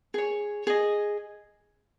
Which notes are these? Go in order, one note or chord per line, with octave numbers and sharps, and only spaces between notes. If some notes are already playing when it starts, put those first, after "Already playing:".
G#4 C#5
G#4 D#5